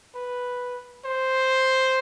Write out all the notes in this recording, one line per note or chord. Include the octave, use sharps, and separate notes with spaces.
B4
C5